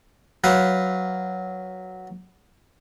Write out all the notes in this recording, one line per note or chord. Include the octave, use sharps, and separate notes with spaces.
F#3 B4 F5